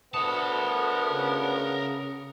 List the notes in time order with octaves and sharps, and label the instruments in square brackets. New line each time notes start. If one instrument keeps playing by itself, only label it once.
[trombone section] D2 A2 B3 [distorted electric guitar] A#4 A5 [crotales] D#6 C#7 F7
[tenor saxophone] C#3